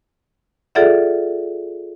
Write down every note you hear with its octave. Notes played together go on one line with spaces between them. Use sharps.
F4 G#4 A4 D5 E5 F#5